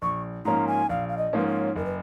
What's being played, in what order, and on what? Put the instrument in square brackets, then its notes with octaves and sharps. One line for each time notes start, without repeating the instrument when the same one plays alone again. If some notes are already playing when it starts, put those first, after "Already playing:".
[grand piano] A#1 [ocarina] C#6
[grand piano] G#2 F3 A#3 C#4 [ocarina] A#5
[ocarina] G#5
[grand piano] A#1 [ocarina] F5
[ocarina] F5
D#5
[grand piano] G#2 F3 A#3 C#4 [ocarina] B4
[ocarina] C#5
[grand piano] F#1 [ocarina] A#4
[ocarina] B4